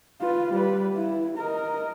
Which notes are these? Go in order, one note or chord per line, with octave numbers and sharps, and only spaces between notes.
F4 B4
G3 B4
E4
A#4 D#5